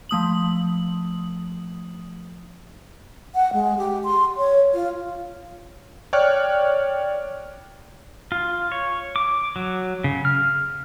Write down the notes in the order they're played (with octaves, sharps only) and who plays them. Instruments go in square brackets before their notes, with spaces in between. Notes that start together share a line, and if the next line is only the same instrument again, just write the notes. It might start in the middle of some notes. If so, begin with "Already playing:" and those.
[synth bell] F3 A3 D#6 F#7
[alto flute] F#5
G#3
G4
C6
C#5
F4
[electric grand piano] C#5 D5 G5 C#6 F6 F#6
[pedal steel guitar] F4
C#5
D6
F#3
C#3
F6